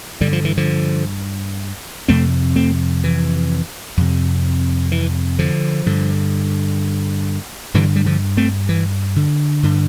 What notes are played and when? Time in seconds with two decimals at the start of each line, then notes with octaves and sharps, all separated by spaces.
0.21 G2 D3 G3
0.33 F3
0.45 E3
0.57 D3 F3
2.08 F2 C3 A3 C4
2.56 A3 C4
3.04 E3
3.97 F2 C3
4.92 E3
5.39 D3 F3
5.86 G2 D3
7.74 G2 D3 E3 G3
7.96 G3
8.06 D3 F3
8.37 A3 C4
8.69 E3
9.16 D3
9.63 G2 D3